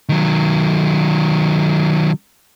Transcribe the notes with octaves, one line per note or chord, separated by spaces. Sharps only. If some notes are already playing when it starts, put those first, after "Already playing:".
D#3 F#3